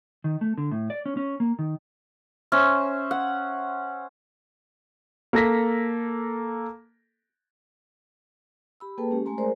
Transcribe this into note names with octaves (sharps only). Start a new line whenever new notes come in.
D#3
A3
D3
A2
D5
C#4
C#4
A#3
D#3
C#4 C5 E5
F#5
A#3 A4 A#6 B6
G4 B5 E6
A#3 G#4 A4 B4 G5 A5
G#3 C#4 G4
G#3 A3 G#5 A#5 C6
G#4 A#4 C5 D5